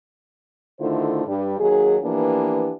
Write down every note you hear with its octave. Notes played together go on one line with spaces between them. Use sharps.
D3 D#3 A3 E4 F4 C5
G2 G3
D#2 D#3 F#3 G#4
E3 F3 A#3 B3 D4 G4